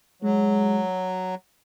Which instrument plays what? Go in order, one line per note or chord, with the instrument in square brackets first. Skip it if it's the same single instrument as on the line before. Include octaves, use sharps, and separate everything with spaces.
[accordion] F#3 [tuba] G#3